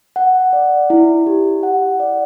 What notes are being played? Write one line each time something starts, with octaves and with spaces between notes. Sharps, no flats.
F#5
D5
E4
G4
F#5
D5